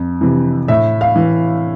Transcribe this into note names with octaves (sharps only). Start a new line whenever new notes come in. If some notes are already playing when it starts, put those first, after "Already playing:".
Already playing: F2
C3 E3
A2 E5
F5
E3